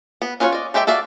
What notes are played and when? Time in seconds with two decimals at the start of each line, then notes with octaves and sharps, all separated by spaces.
0.22 B3
0.40 C#4 F4 F#4 B4 C#5
0.53 D5 D#5
0.74 G#3 G4 A4 E5 G5
0.87 F#4 A4 D5 E5 F5